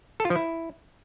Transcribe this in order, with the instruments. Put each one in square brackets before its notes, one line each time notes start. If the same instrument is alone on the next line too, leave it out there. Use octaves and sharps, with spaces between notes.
[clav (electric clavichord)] A4
F4
F3
E4